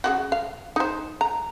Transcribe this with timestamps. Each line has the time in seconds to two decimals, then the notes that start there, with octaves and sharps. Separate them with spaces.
0.04 C#3 E3 F#4
0.32 F5
0.76 D#4 C5
1.21 A#5